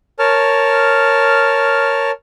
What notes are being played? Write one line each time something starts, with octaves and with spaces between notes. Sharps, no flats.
A#4 C#5 A5 F6